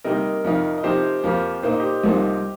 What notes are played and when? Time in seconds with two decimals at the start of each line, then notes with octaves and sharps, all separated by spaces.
0.04 C3 G3 A#3 D#4 A#4 D#5
0.44 F2 C3 F3 D#4
0.78 D#5
0.83 C3 F3 D#4 G4 C5
1.24 F2 F3 A#3
1.63 A#2 A#3 D#4 C5
1.72 D#5
1.80 G4 C5
2.03 C2 C3 F3 A#3 D#4